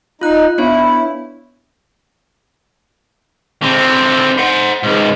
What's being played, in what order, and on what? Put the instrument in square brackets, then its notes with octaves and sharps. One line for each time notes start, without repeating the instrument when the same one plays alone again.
[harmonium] D#4 [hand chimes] F4 F#6
[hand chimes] B3 D4 C#5 [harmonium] E4
[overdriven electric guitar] D3 C4
C5 F#5
C#2 G#2